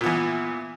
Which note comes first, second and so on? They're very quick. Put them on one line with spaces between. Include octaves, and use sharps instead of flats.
A#2 B3 E3